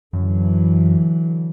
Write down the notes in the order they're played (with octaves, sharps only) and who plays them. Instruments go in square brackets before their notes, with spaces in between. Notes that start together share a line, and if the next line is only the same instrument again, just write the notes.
[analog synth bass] F#2 [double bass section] D3 E3 F#3